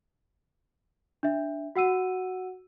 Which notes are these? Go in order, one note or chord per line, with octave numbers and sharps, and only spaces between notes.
D4 E5
F#4 F#5 E6 D#7